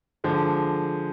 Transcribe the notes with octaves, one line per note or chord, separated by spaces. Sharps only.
D3 F3 G#3